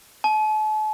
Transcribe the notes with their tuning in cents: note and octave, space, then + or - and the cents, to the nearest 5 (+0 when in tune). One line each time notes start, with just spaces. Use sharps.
A5 -40